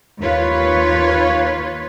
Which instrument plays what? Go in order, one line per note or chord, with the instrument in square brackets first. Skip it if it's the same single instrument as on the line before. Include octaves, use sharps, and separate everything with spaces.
[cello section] D#2 F4 B4 C#5